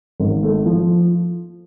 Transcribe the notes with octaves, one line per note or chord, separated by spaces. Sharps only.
G#1
A3
F3